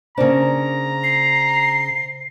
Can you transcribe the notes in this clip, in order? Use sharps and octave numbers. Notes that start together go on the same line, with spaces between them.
C#3 A#3 D4 C5 A#5
C7